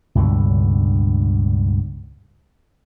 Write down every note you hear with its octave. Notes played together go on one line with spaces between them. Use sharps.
C#2 G2 B2 D3